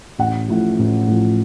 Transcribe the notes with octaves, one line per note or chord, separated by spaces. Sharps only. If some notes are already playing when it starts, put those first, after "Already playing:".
A1 F#5
A2 F3
A1
A2 F3